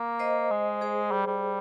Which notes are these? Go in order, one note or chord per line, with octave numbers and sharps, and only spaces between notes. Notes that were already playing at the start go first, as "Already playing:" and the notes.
Already playing: A#3
C5 D#5
G#3
G#4 C5
G3
G3